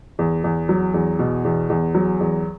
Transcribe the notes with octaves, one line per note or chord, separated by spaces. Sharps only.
E2
E2
F#3
E2
B2
E2
E2
F#3
E2